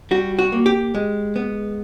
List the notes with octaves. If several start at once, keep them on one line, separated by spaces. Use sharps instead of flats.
G3 F#4
F#4
A#3
G4
G#3
B3